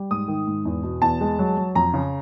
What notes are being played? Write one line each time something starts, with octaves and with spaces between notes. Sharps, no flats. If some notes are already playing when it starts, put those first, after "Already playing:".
Already playing: G3
G#2 D#6
D#3
G#2
E2
B2
E2 A5
G#3
F#3
F#3
F2 A#5
C#3